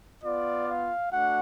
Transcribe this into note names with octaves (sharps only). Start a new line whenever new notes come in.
B3 F4 D5
F5
A3 D4 F#4 F#5